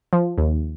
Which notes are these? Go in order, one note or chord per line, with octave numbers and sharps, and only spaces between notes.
F3
D#2